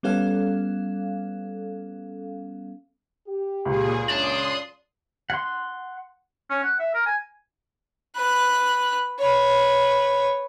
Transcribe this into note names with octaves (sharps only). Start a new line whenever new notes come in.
G3 B3 C#4 A4 F5
G4
C#2 A#2 G#4
F#2 C#4 D5 A5 C6 D#6
F#5 C6
C#4
F#5
E5
A#4
G#5
B4 F#6
B4 C#5